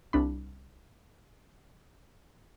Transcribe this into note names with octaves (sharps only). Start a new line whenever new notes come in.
C2 D4 B5